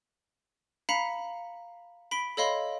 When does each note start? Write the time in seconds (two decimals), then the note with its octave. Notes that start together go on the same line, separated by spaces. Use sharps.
0.89 F5 A#5 B5 B6 C#7
2.11 B5 B6 D7 G7
2.37 A4 C#5 D#5 F5 B5 C6